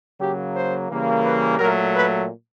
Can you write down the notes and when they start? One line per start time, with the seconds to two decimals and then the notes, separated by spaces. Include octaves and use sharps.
0.20 C#3 F#3 A#3 G4
0.55 C5
0.90 C#3 E3 G3 A#3
1.24 B4
1.59 A#2 F#3 A3 A#4
1.94 B4